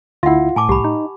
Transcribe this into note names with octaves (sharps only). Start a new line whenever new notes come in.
D2 E4 F4 E5 F#5
A2 G#5 A5 D6
C2 G4 B5
D#4